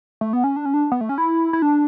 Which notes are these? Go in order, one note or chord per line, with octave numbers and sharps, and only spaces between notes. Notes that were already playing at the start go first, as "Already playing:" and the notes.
A3
B3
C#4
D4
C#4
D4
B3
A3
C#4
E4
E4
D4